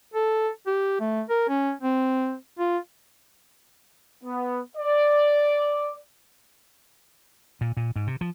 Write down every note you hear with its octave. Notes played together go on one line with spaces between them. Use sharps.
A4
G4
A3
A#4
C#4
C4
F4
B3
D5
A#2
A#2
G#2
C3
F3